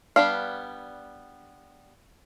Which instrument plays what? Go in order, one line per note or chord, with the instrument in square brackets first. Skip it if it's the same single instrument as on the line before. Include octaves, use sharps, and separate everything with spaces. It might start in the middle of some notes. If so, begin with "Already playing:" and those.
[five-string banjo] G3 B3 D4 F5